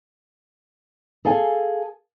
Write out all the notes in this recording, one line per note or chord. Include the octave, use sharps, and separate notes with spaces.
G#4 A4 F5 G#5